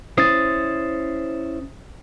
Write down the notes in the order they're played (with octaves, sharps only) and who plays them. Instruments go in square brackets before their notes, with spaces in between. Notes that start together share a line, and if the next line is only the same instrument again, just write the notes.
[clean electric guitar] C#4 E4 C5 [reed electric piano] D#6 A6